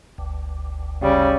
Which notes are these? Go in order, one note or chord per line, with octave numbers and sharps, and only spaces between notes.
G1 D2
C#3 G3